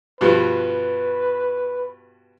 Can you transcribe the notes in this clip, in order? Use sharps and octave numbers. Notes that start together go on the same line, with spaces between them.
G2 B2 F3 B4